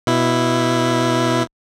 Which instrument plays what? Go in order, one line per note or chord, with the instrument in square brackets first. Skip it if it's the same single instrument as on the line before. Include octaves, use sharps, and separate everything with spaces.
[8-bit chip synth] B2 E4